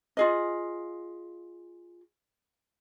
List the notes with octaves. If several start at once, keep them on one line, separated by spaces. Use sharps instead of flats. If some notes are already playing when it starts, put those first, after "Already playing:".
F4 G#4 D#5